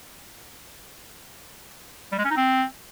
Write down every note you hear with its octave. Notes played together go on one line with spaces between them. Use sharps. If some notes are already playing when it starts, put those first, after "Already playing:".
G3
G#3
C#4
D#4
C4